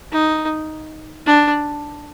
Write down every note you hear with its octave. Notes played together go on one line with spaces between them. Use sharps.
D#4
D4